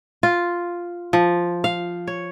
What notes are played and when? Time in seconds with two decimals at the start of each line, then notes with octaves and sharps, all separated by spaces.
0.23 F4
1.13 F3
1.64 F5
2.07 C#5